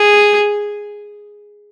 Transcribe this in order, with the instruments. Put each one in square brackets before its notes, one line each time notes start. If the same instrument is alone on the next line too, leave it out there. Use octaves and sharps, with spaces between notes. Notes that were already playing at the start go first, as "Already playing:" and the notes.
Already playing: [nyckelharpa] G#4